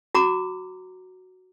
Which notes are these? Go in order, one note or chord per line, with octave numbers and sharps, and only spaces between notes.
F#4 A#5 D6